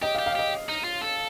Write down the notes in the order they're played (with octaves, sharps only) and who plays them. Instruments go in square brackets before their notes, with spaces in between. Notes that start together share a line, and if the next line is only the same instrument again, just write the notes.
[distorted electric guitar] G4 [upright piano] D#5
[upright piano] F5
[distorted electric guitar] G4
[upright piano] F5
[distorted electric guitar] G4 [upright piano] D#5
[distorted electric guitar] D#4
F4
A4